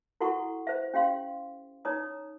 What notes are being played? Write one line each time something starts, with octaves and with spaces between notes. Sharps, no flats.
E4 F#4 A4 F#5 A#5 C#6
C5 E5
C#4 G4 F5 C6
D#4 C#5 A#5 D#6